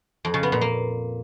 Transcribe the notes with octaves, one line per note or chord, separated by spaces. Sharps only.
F2
C#3
B3
A#2
A#3